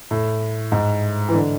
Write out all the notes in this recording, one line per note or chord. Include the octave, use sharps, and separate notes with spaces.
A2
G#2
E3
D3